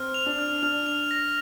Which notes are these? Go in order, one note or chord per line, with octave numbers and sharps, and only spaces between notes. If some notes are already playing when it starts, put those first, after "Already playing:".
Already playing: C4 F6
F7
D4
F6
D4 F6
F7
A#6